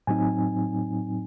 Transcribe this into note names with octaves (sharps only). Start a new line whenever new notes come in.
A2 F#3 C4 D#4 G#5